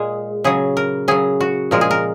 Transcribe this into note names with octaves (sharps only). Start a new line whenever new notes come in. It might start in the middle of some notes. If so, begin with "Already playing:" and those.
Already playing: A#2 G#3 G#4
C#3 F#3 G#4
A#4
C#3 F#3 G#4
F#4
A#2 F3 G#3 A#4
G#4
A#4